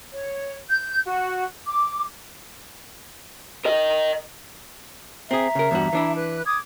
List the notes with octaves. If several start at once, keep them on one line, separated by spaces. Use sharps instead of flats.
C#5
G6
F#4
D6
A#4 D#5
C4 G#4 E5 A#5
C#3 A#4
E2 G2 F#4
E3 D4 E4
B4 F#6
D6 D#6 G#6